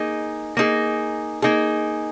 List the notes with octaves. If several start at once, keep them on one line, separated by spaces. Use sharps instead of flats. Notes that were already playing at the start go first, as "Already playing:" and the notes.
Already playing: A#3 D#4 G#4
A#3 D#4 G#4
A#3 D#4 G#4